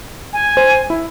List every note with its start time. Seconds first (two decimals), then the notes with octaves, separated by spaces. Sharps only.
0.33 G#5
0.57 C5
0.90 E4